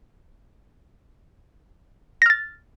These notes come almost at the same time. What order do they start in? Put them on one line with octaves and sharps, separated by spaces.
A#6 F6 A6